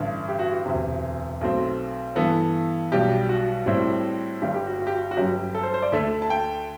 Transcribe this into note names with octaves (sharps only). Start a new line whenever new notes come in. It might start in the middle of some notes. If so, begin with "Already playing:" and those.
Already playing: A1 G2 D3
G4
F#4
G4
E1 D2 C3
B1 B2 A3 C4
G2 E3 B3 A4
B1 B2 G3 G4
F#4
A2 G3 C4 E4
G1 G2 D3 G3 G4
G4
F#4
F#4
G4
F#4
F#4
G1 F#2 F#3 G4
A4
C5
C5
D5
D2 D3 A3 E5
A5
G5